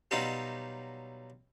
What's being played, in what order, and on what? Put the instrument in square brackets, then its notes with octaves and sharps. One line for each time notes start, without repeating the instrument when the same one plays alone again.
[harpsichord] B2 F#3 G3 D#4 F4 G4